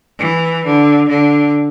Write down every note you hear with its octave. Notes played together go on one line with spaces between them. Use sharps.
E3
D3
D3